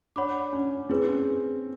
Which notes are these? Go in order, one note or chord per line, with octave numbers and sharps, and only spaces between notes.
D4 C#5 F#5 B5 D6
C#4
C4 E4 G#4 B4
C#4